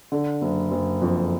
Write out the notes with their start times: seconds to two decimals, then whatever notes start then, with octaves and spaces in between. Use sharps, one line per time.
0.12 D3
0.42 F#1
0.71 F#1
1.01 F2